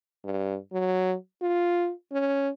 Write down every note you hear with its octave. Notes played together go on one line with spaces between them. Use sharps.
G2
F#3
F4
C#4